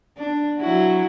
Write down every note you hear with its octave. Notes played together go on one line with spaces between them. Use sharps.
D4
F#3 E4 F#4